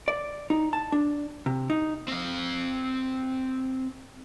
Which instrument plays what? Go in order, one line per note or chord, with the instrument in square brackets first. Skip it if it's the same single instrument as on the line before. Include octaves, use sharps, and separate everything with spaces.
[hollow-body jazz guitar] D5
D#4
A5
D4
C3
D#4
[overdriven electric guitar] C4 F5